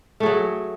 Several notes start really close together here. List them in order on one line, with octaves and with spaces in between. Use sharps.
A3 G#4 F#3